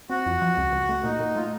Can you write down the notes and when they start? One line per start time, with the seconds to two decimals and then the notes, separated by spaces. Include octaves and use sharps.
0.10 C4 F#4
0.26 F2
0.42 F3
0.57 C#2
0.72 C#2
0.89 A3
1.04 A#2 D#4
1.20 A#2
1.35 A3 F4
1.43 D#4